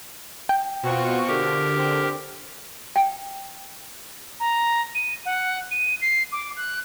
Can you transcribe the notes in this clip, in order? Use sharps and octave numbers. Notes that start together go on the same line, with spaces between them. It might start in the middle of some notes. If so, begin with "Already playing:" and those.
G5
B2 C4 F4 F#4 C#6
D3 G4 A#4
C4
G5
A#5
D#7
F#5
D#7
C7
D6
F#6